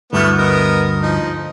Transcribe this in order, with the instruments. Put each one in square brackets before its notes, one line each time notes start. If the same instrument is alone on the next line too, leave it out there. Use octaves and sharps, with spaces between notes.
[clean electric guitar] D2 G2 [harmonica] A3 B3 E4
[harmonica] B3 A#4 D#5
F3 D#4